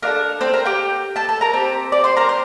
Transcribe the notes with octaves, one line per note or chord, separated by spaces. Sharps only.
D4 F4 A4 A#4
C4 C5
A#4 A#5
G4 G5
A4 A5
A4 A5
A#4 A#5
C4 G4
D5 D6
C5 C6
A#4 A#5
C5